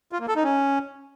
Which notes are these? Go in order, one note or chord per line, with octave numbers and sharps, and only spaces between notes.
F4
A#3
A4
D#4
C#4